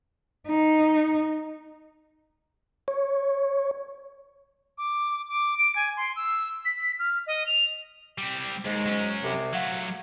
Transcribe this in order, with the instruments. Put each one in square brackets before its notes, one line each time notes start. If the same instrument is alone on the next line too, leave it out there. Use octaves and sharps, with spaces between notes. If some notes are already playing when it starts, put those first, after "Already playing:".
[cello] D#4
[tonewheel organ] C#5
[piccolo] D6
D6
D7
G#5
C6
E6
B6
F6
D#5
F7
[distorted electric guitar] G3 C4
[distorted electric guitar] D#2 [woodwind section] G#2 G#3
[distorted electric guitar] F#3 C#4
[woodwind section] C2 C3
[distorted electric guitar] F#3 A3 [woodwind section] F5 F#5